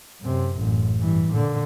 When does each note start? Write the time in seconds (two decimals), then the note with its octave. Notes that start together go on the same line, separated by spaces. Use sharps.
0.21 F#2 C3
0.57 A1 F#2
0.99 G2 E3
1.31 A#2 D3